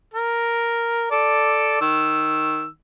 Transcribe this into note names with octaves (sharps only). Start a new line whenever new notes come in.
A#4
A4 D5
D#3 E6